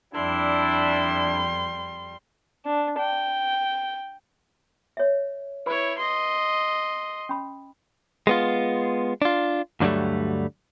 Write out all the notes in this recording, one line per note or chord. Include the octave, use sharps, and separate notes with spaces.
F2 G3 D4 E4 C6
D4
G5
C#5 E5
E4 B4 C#5 B5
D#5 C6
C#4 B5
G#3 B3 F4
D4 F4
D2 G2 D3 F#3 G3 A3